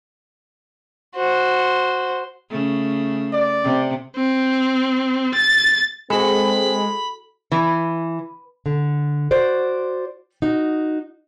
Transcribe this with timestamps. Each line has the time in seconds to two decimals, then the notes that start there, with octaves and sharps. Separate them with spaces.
1.15 F#4 C5
2.50 C#3 A3
3.33 D5
3.64 C3
4.16 C4
5.35 A6
6.10 G#3 C4 F#4 A4 B5
7.52 E3
8.66 D3
9.31 F#4 C5 D5
10.42 D#4 F#4